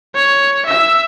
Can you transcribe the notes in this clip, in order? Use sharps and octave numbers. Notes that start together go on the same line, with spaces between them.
C#5
E5 E6